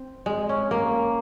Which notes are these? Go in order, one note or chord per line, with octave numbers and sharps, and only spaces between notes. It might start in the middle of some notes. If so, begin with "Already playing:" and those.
Already playing: C4
G#3
C#4
A#3